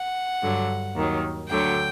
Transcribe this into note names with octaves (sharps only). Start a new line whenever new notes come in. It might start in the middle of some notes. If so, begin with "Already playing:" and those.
Already playing: F#5
G2 D3 F#3
D#2 D#3 F#3
D2 D3 F#3 G5